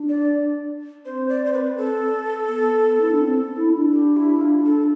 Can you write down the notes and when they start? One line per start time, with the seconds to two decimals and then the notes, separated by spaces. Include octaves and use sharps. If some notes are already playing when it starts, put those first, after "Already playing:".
Already playing: D4
0.09 D5
1.05 C4 C5
1.29 D5
1.45 C5
1.53 B4
1.77 A4
2.49 B3
3.00 E4
3.11 D4
3.21 C4
3.57 E4
3.74 D4
3.93 G4
4.16 E4
4.41 F4
4.65 A4